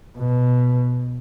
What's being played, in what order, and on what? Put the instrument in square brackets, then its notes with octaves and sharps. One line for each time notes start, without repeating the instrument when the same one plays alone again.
[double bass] B2